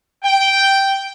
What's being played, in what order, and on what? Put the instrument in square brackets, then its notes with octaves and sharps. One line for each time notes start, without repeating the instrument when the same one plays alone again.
[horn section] G5